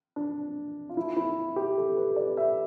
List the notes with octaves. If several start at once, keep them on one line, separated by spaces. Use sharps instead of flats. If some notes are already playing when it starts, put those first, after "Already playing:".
D4
F4
E4
E4
G4
A4
B4
D5
E5